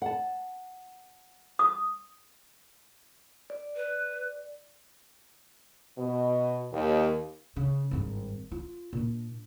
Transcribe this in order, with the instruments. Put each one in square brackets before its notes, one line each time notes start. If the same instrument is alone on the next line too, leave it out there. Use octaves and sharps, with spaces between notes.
[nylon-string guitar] F#5 A5
[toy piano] D#6
[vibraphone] D5
[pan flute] B4
[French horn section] B2
D#2
[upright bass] C#3
G#1 G2
F4
A#2 D4